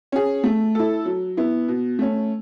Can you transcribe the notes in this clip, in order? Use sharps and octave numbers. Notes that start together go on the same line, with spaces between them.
C#4 G#4
A3
E4 A4
F#3
B3 E4
B2
A3 C#4